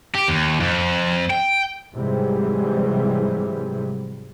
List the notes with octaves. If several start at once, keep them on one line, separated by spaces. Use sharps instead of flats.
G4
D#2
F2
G5
G#2 C3 E3 F#3 G3